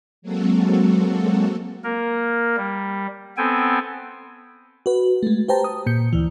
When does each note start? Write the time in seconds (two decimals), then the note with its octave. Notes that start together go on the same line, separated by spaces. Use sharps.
0.22 F#3 G#3 A#3 C4 F#4 A4
1.84 A#3 A#4
2.56 G3
3.37 B3 C4 A4 G5 G#5
4.86 F#4 B4
5.23 G#3 A3
5.48 G4 B4 C5 G5 A5 A#5
5.64 D#6
5.86 A#2 G6 C#7
6.13 D2 E3